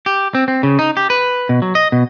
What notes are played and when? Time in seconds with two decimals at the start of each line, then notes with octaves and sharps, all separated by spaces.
0.06 G4
0.35 C4
0.48 C4
0.63 C#3
0.79 D#4
0.97 G4
1.10 B4
1.49 B2
1.62 F#3
1.75 D#5
1.92 B2